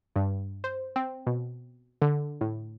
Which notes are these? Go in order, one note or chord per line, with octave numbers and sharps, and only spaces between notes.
G2
C5
C4
B2
D3
A2